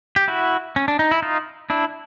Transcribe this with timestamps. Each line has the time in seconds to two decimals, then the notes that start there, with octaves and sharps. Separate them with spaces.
0.16 G4
0.28 E4 F#4
0.76 C#4
0.88 D4
0.99 D#4
1.11 E4
1.22 D#4 F4
1.70 D4 E4